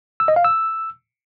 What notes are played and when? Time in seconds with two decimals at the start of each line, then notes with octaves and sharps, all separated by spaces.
0.20 E6
0.28 D#5
0.36 F5
0.45 E6